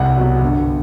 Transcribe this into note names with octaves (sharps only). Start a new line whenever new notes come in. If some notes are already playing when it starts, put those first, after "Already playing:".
Already playing: C2 F#5
B2 F#3
G1